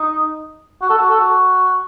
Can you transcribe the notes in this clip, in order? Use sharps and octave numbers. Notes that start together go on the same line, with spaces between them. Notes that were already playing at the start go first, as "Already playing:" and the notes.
Already playing: D#4
F#4
A4
F#4
A4
F#4